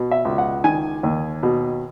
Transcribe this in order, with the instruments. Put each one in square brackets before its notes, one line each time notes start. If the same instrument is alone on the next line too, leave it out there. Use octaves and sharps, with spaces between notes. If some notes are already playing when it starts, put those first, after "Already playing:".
Already playing: [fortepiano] B2
E5
C#2
F#5
D#3 G#5
D#2
B2